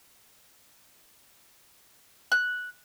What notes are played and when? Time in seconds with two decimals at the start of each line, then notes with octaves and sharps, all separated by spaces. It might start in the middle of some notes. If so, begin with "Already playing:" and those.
2.32 F#6